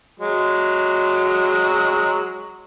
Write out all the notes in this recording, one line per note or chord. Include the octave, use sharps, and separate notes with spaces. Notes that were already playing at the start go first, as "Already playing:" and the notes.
F#3 G#3